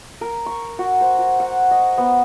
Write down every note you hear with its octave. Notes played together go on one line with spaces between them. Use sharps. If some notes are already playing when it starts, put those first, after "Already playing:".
A#4
C#6
F#4
C5
F#4
F#5
D#5
B3